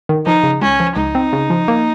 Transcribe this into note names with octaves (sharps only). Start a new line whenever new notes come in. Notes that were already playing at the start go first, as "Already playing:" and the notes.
D#3
F3 D#4
C#3
C#2 C#4
F3
C#2 D#4
C4
C#3
F3
A#3